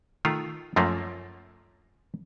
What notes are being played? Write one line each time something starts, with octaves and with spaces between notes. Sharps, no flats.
D#3 A3 F4
F#2 F3 A3 A#3